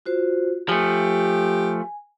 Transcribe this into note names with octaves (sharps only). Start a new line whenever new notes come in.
F4 F#4 C5
F3 A3 G4 G#5